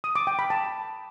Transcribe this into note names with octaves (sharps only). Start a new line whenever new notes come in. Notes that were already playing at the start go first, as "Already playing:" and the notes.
D#6
D6
G5
B5
A5